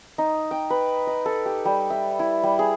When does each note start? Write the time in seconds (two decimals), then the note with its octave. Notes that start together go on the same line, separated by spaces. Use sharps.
0.18 D#4
0.51 G5
0.70 B4
1.07 D#5
1.26 A4
1.45 G4
1.65 G3
1.90 E5
2.19 E4
2.43 G3
2.59 G#4